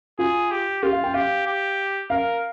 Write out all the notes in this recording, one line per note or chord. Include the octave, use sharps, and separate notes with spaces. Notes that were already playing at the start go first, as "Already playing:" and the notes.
F4 G#4
G4
F4 G4
F5
G5
G4 F5
G4
A#4 F5